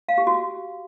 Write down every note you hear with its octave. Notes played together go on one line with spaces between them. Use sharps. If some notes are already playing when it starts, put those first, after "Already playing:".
F5
G4
F#4